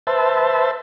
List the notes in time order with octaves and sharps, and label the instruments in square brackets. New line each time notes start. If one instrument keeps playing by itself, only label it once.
[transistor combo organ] B4 C5 E5 A5